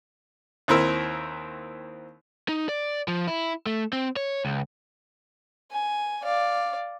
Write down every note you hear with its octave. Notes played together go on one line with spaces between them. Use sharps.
D#2 C4 E4 A#4 E6
D#4
D5
F3
E4
A3
C4
C#5
C#2
G#5
D5 F5